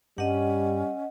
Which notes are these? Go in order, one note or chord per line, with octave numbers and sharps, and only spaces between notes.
G2 G3 C#4 D#5 F#5